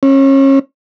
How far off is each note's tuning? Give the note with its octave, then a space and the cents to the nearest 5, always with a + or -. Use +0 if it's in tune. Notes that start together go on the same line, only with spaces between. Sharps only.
C#4 -30